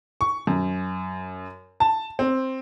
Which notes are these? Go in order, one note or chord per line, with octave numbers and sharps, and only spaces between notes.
C#6
F#2
A5
C4